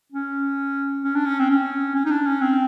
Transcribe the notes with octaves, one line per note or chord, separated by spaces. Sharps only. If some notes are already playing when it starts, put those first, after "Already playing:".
C#4
C#4
D4
C#4
C4
C#4
C#4
D#4
D4
C#4
C4